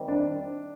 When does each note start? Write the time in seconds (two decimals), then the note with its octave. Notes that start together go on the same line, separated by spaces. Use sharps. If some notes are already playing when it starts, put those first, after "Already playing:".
Already playing: D#3 G3 C4
0.08 D4